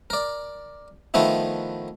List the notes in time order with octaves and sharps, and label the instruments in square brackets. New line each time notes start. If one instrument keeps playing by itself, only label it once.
[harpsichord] A#4 D5
D#3 F3 A3 B3 D#4 E4